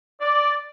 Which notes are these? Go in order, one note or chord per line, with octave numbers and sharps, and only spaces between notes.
D5